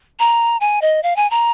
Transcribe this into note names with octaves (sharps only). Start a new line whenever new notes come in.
A#5
G#5
D#5
F5
G#5
A#5